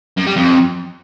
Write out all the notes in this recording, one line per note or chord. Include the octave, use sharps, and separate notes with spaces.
F#2
G3
F2